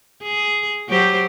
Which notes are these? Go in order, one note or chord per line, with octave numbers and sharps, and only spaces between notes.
G#4
F#3 G4 C5